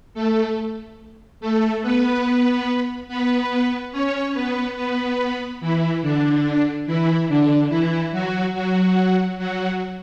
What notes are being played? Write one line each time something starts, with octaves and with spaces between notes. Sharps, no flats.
A3 A4
A3 A4
B3 B4
B3 B4
C#4 C#5
B3 B4
B3 B4
E3 E4
D3 D4
E3 E4
D3 D4
E3 E4
F#3 F#4
F#3 F#4
F#3 F#4